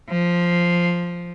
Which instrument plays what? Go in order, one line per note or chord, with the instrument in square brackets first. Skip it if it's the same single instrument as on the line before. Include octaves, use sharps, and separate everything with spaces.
[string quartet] F3